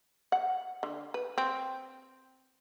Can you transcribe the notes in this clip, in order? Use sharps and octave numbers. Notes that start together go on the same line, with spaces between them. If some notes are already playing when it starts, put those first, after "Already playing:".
F#5
D3
B4
C4